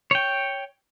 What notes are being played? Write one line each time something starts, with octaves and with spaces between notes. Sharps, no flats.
C#5 G5